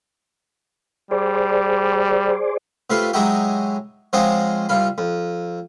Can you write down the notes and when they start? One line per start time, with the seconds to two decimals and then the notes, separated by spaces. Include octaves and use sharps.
1.11 G3 G#4 C5 D5
2.90 C3 A3 F4 B4 C6
3.13 F#3 G#3 D#4 E4 F#4 G4
4.13 F3 G#3 C4 F#4 C#5 D#5
4.69 C2 F4 B5
4.98 F2